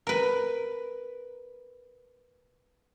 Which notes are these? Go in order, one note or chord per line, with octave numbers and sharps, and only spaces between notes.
A#4 B4